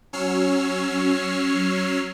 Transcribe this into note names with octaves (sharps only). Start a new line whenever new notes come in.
F#3 C#4 C#5 E6 F6 C7